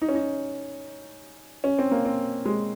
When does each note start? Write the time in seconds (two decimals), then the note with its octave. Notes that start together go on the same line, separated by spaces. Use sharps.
0.02 D#4
0.09 C#4
0.15 D#4
1.64 C#4
1.79 C4
1.91 A#3
2.05 C4
2.46 G#3